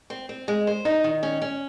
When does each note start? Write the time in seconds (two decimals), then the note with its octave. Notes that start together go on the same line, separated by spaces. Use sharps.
0.10 C4
0.29 C4
0.48 G#3
0.67 C5
0.85 D#4
1.04 D#3
1.23 C#4
1.42 C#4